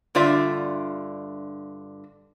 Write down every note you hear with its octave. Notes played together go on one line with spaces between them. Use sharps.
G2 D3 F4 D5 E5